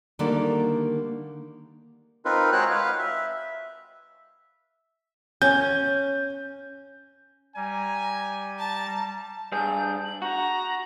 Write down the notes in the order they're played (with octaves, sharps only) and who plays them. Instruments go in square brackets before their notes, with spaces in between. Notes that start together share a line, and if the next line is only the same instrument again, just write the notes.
[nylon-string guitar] D3 D#3 G3 A#3 A4 D5
[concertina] C4 D#4 F4 A#4 B4
G#3 F#4 C5 C#5 G5 F#6
B4 F5
E5
[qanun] C#4 [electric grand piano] G6
[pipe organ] G3 [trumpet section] G#5 [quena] A#5
[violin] A5 [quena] A#5
[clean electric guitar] G2 D4 G#4 [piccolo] G6
[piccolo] F#7
[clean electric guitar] F#4 [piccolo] A#5